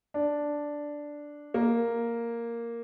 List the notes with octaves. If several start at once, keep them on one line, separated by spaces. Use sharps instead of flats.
D4
A#3